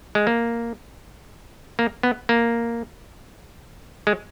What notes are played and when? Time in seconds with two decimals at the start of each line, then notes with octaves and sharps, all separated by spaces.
0.15 G#3
0.27 A#3
1.79 A#3
2.03 B3
2.29 A#3
4.07 G#3